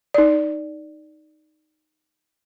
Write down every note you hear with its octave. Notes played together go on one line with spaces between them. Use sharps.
D#4 D5